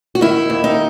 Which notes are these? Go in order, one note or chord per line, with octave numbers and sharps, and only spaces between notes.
F#4
D#3 E4
D#2
D#4